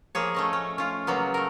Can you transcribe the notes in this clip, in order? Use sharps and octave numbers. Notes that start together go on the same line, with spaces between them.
F3 A#3 G#4 C#5
A3 C#4 D#5
C#4
C#4 F4
C#3 F#3 A#3 B3
A3 A#4